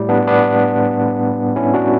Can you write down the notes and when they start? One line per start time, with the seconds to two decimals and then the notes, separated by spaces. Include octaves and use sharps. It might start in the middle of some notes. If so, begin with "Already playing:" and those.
Already playing: A2 G3
0.09 B3 D4
0.27 B3 D4
1.56 C#4 E4
1.74 D4 F#4